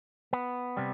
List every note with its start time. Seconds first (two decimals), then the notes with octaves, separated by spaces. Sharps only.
0.33 B3
0.77 C3 G3